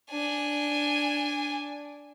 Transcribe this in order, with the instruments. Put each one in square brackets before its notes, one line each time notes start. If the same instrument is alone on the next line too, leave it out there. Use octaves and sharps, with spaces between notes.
[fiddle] D4 G#5